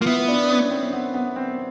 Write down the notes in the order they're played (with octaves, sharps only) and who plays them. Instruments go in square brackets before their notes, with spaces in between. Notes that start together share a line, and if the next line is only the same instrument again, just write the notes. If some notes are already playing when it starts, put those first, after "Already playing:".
[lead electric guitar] A#3 [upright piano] F4
[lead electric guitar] B3 [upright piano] E4
[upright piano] D4
C#4
C4
C4
B3
B3
C4